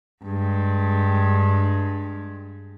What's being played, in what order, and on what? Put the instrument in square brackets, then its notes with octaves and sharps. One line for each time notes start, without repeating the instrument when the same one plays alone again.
[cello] G2 G#3